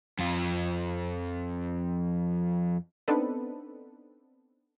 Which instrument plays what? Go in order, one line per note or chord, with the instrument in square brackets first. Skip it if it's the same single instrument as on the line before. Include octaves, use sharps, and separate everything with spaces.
[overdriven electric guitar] F2 F4
[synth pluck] B3 C4 D4 D#4 A4 B4